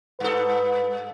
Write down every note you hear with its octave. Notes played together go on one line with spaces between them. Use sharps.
G2 A4 B4